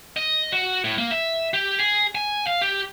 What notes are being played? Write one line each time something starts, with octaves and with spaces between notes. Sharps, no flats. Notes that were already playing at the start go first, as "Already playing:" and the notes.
D#5
F#4
A2
A#3
E5
G4
G#4
G#5
F5
G4